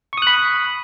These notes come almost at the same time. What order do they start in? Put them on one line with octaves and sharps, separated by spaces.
C#6 D#6 F#6 B5